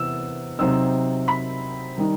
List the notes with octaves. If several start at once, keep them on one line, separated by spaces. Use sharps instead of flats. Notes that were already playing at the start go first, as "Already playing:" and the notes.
Already playing: C3 E3 B3 E6
C3 F#3 C4 D#4 E6
B5
D#3 G3 D#4